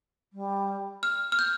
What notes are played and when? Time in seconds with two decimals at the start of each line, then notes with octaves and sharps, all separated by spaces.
0.33 G3
1.03 F6
1.32 F6
1.39 G6